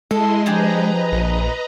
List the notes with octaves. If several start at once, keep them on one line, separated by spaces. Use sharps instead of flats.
G#3 E4 A4 D#5 C6
F3 D4 G4 G#4 B4 D#5 A#5
A#1